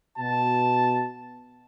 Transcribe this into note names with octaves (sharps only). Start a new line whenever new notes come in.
B2 A5